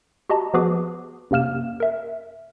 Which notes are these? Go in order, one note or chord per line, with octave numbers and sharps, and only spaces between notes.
F#4 G4 D#5 A5 A#5
F3 B3 F#4 G#4 B4 D6
F#2 C3 A#3 F6 E7
A#4 E5